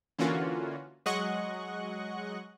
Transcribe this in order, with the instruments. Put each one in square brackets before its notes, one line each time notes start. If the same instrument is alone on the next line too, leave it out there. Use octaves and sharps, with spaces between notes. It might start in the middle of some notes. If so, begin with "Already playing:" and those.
[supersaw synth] D3 E3 A#3 C#4 F4 F#4
F#3 G#3 D#5 F#5 C#6 F#6